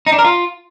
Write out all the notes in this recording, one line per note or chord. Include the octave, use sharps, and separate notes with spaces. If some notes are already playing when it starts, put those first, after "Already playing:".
D#4
D4
A#4
F4